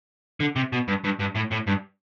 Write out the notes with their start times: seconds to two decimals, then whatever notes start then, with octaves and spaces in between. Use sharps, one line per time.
0.40 D3
0.56 C3
0.73 B2
0.88 G2
1.05 G2
1.20 G2
1.36 A2
1.52 A2
1.68 G2